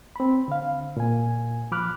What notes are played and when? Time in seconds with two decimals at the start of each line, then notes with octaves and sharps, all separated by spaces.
0.16 C4 B5
0.48 D3 F5
0.97 A#2 G#5
1.72 F3 B5 D6 F6 F#6